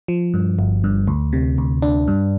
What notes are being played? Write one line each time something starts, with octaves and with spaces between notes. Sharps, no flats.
F3
G2
G1
G2
D2
C3
D2
D4
G2